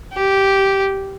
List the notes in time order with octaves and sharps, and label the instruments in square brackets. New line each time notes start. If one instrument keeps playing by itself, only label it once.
[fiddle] G4